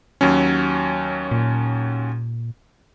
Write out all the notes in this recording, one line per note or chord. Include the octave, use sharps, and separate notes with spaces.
D#2 F#3 C#4
A#2